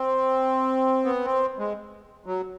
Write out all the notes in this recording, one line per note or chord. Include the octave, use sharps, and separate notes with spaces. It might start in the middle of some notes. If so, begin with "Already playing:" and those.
Already playing: C4
B3
C4
G#3
F#3